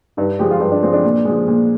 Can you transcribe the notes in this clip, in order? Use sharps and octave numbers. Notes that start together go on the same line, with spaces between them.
G2 D#4
F3 G#3 G4
F4
G2 G4
D4
F3 G#3 C4
D4
A#2
F3 G#3
A#2